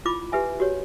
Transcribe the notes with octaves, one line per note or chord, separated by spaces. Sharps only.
E4 F4 B5 D6
G4 B4 E5 G#5
F#4 G4 C#5